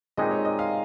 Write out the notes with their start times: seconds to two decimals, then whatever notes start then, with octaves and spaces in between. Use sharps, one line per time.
0.17 A#2 G#3 C4 D#4 G4 D#5
0.31 C#5
0.45 D#5
0.59 F5